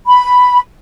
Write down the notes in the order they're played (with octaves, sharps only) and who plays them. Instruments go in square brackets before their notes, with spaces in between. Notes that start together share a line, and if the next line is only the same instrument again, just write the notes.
[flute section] B5